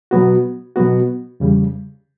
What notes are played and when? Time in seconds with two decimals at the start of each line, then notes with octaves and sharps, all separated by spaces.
0.11 B2 F#3 B3 F#4
0.76 B2 F#3 B3 F#4
1.40 E2 C#3 G3